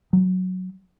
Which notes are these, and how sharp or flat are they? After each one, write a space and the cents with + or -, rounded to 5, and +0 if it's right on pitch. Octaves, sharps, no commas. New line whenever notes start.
F#3 +0